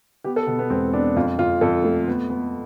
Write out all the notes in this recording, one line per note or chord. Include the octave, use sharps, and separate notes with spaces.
B3 G4
A4
B2 B3
B3
E1 C4
B3 D4
F2 F4
F2 F4
F2 A4
A3
B3
B3